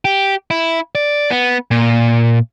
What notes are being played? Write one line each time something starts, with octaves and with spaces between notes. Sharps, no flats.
G4
E4
D5
B3
A#2